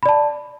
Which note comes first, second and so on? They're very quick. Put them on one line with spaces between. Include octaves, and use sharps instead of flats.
B5 D5 A5